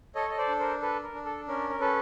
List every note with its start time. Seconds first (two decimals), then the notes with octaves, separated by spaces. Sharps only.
0.15 A4 C#5 D#5
0.30 D#5
0.38 C5 D5
0.49 D4
0.59 A#4 C5
0.81 A4 B4
1.04 A#4
1.14 D4
1.25 A4
1.48 C#4 A#4
1.70 A#4
1.80 C#4 A4 B4